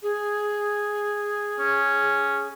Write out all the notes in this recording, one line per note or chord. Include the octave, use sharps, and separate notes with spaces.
G#4
C#4